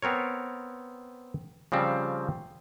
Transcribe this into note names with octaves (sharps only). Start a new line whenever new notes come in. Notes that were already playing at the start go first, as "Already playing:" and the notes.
B3 C4 A#4 C#5
C#3 F3 G3 C4